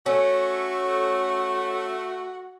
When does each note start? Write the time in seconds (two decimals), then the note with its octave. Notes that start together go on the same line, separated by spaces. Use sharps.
0.06 A3 C#4 F#4